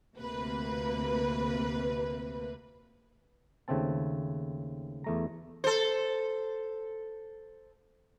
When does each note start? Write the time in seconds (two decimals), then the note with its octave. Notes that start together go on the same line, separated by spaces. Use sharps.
0.18 D2 C3 A#3 B4
3.68 D#2 C#3 A3 C4 A5
5.04 E2 A3 A#5
5.64 A4 C5